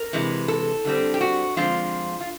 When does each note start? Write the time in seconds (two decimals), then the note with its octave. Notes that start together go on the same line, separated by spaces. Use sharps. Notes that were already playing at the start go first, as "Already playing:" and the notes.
Already playing: A#4
0.13 C3 E3 G#3
0.48 A4
0.85 D3 G3 C4
1.14 G4
1.21 F#4
1.56 D3 F3 G#3 C4 F4
2.20 F4